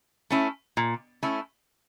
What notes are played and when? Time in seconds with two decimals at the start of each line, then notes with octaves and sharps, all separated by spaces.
0.30 A3 C#4 E4
0.77 A#2
1.23 A3 C#4 E4